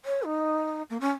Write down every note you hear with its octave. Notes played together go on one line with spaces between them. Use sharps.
C#5
D#4
A#3
C#4